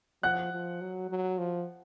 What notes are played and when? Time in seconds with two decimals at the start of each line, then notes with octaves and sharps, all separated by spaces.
0.23 F3 F#5 F#6
0.52 F3
0.81 F#3
1.10 F#3
1.38 F3